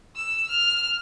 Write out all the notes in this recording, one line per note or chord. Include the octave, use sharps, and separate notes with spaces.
E6
F6